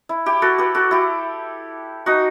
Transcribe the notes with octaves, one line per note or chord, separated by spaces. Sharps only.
E4
E4 G4
F#4 A4
G4 B4
F#4 A4
E4 G4
D#4 F#4